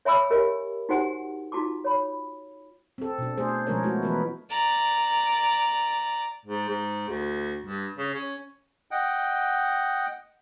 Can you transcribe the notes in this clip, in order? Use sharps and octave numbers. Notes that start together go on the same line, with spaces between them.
C#5 E5 G#5 B5 D6 E6
G4 A#4 C#5 D#5 G#5
D#4 F#4 G4 C5 F#5 G#5
D#4 F4 F#4 A5 D6
C#5 B5
C4 A4
B2 D4
A3 D4 G#4 C5
B2 F3 G#3 C#4 A#4 C#5
G#3 A3 B3 E4 F#4
E3 F3 B3 A#4 B4
D5 A#5
G#2
G#2
D2
G2
C#3
C#4
D#5 F#5 G5